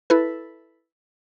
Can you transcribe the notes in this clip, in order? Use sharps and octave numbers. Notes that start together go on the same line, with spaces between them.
E4 A4 B4